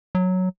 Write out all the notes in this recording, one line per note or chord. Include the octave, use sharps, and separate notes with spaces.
F#3